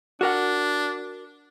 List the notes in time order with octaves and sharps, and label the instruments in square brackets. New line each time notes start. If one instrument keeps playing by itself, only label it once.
[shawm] D4 [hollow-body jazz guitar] F#4 A#4 F#5